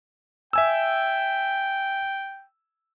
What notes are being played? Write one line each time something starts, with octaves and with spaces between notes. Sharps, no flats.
E5 G5 G#5 E6